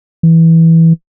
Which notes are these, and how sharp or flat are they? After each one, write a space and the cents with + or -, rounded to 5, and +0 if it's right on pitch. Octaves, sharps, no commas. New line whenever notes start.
E3 -10